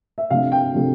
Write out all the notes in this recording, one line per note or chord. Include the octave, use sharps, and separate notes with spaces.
E5
C3 F3 A3 D4 F5
G5
C3 F3 A3 D4